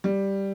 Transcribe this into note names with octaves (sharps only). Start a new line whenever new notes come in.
G3